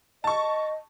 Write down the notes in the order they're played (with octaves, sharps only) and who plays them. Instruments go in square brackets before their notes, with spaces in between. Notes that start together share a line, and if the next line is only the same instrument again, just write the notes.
[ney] D#5 [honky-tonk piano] A5 C#6